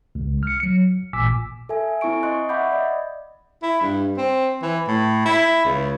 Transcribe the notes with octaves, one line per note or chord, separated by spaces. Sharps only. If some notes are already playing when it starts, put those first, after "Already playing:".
C#2
F6 C#7
F#3 C#7
A1 A#2 G#5 D6 E6 B6
A4 E5 G#5
C4 E4 G#5 C#6 D7
D#5 C6 C#6 F#6
E5 F#5 B5 D6 G6
D5 D#5
E4
G2
C4
E3
A2
E4
C#2